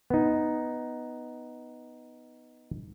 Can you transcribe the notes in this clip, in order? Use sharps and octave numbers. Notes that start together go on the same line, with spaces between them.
B3 D#4